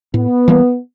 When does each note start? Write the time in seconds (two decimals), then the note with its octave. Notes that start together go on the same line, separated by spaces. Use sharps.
0.14 A2 B3
0.48 E3 G3 A#3